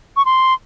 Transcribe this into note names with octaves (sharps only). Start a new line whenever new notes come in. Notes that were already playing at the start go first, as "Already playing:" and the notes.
C#6
C6